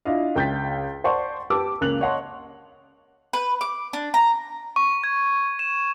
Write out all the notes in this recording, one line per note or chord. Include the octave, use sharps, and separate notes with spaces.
D4 E4 F4 D#5 F5
C#2 G5 G6 A6 B6
C5 D5 F#5 A5 C6 C#6
G4 B4 A5 D6 E6
C#2 C#3 A#3 F#6 F7 F#7
C#5 D#5 F#5 A5 C6 C#6
B4
D6
D4
A#5
C#6
G#6
E7